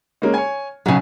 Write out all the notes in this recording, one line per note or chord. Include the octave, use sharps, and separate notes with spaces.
G#3 A#3 C#4
C#5 G#5
B1 C#3 F#3 G#5